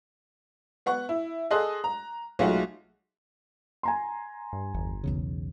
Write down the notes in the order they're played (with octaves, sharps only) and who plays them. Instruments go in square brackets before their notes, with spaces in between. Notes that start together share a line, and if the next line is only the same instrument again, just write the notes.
[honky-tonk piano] B3 F#5 C#6
E4
G#4 A4 D#5 C6 D#6 F#6
A#5
B1 G#3 A3 F4 F#4 F#5
[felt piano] G#5 A#5 C6
[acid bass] G2
[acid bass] G1 [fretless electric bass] E2
[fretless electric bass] B1 E2 C#3